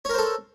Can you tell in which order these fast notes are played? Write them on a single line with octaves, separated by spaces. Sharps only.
C#5 A#4 C5 A4